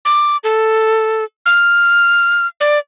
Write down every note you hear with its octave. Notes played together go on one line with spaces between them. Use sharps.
D6
A4
F6
D5